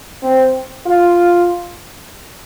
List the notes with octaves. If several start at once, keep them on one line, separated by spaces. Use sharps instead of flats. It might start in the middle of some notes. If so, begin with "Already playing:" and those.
C4
F4